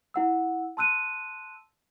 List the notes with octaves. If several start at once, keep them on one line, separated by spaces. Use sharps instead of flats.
E4 F#5 E6
A5 C6 E6 F#6 D#7